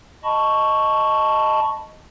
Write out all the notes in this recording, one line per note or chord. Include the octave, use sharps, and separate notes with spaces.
D#5 A5 B5 C#6